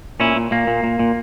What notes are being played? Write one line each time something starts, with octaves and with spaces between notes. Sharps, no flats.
A#2 C#4 E4
A#2
A#2 A#3
A#2
A#2
A#2